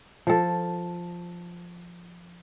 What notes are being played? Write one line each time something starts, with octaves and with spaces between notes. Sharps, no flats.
F3 A4